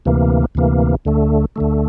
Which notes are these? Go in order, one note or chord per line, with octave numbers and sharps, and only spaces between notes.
D2 C3 E3 A#3
D2 C3 E3 A#3
D2 D3 A3
D2 D3 A3